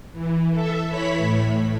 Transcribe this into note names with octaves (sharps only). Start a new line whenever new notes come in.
E3
A4 E5
E3 E4 C#5 B5 B6
A2